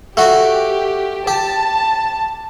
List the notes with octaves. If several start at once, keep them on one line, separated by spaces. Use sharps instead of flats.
A3 F#4 G4
G4 A5